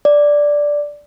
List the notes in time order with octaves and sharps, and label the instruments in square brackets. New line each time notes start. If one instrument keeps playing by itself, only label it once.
[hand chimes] D5